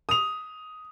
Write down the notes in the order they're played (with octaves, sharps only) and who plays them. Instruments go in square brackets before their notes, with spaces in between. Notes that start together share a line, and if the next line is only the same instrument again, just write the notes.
[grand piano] D#6 F7